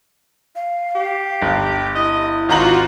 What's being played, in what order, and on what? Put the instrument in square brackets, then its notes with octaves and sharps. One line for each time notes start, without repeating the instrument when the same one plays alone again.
[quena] F5
[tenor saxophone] G4
[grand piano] G1
[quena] E4 [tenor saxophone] D#5
[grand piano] G#1 A#5 F#7 [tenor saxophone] D#4 [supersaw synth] F4 F#4